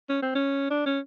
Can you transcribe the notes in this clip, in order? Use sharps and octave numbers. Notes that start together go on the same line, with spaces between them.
C#4
C4
C#4
D4
C#4